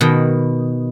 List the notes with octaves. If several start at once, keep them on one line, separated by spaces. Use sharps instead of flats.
B2 D#3